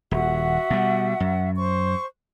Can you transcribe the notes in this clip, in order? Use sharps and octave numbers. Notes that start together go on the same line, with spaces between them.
D#1 F#4 E5 F#5
B2 G3
F#2
C5 C#6